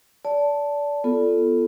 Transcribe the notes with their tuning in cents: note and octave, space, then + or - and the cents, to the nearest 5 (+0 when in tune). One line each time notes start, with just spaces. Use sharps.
D5 -25 A5 +0
B3 +0 F4 -15 A4 +0